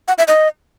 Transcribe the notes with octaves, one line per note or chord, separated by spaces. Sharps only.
F#5
E5
D#5